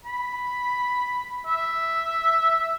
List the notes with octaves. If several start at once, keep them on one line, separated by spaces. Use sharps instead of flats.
B5
E5